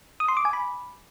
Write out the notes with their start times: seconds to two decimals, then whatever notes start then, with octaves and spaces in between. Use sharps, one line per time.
0.20 D#6
0.28 C6
0.37 D6
0.45 G#5
0.53 B5